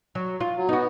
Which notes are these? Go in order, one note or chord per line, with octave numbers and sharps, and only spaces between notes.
F#3
F4
F#3
B3 D#4 F#4